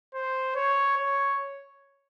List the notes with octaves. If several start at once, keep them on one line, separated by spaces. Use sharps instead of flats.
C5
C#5
C#5